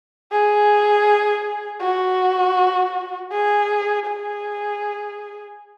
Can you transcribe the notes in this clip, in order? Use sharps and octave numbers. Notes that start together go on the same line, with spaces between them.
G#4
F#4
G#4
G#4